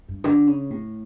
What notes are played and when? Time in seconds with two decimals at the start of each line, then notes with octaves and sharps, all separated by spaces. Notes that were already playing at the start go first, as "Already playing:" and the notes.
0.08 G2
0.24 D3
0.47 C#3
0.70 A2